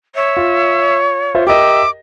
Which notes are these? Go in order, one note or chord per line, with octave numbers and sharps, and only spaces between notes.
C#5 E5
F4
F4 C5 E5
G4 A#4 D#5 E5 D6